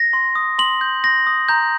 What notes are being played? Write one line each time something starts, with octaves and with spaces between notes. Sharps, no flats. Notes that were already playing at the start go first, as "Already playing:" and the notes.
Already playing: A#6
C6
D#6
C6 F#7
G6
C6 A#6
D#6
A#5 G6